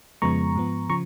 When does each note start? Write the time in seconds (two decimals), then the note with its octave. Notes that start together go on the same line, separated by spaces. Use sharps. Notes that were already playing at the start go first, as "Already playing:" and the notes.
0.22 F2 C#3 F3 G#3 B3 A#5 C#6
0.55 G#2 F3 B3
0.89 C#3 F3 A#5 C#6